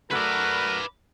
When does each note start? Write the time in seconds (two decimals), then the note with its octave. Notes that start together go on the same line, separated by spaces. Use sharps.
0.11 F#3 A3 F#4 A#4 B4 D5 F#6